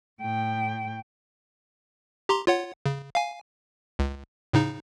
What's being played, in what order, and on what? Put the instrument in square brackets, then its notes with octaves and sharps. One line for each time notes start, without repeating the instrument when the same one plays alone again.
[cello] A2 G5
[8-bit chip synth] G4 A#5 C6
F4 C#5 F#5
C#3
F5 G#5
C#2
A2 C#3 D#4